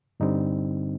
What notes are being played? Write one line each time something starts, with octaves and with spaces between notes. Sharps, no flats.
G2 D3 G3 C4 D#4